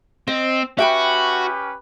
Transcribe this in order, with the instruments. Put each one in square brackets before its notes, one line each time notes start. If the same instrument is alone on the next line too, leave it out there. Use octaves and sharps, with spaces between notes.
[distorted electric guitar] C4 [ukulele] D#5
[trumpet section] C#4 G4 B4 [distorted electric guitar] F#4 [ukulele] E5 G5 B5